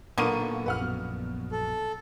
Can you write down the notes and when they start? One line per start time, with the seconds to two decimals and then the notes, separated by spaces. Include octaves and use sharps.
0.18 B1 A#2 D3 A#3 B3 C#6 D#7
0.66 A#1 F#2 B4 F#5 F6
0.80 B2
1.52 A4